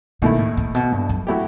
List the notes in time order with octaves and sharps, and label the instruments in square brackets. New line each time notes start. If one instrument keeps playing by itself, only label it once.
[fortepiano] D#2 D#3 A3 E4 [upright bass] B2
[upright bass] A2
A2
B2
G2
F#2
[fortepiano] F#3 A3 E4 G4